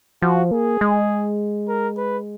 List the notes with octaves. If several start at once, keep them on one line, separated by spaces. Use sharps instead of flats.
F3 F#4
A#3 G#4
G#3
A#4
B4